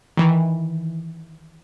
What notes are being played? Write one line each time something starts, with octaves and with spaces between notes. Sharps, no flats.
D#3 E3